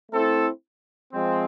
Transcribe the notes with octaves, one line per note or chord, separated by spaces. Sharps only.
A3 C4 E4 A4
F3 G#3 C4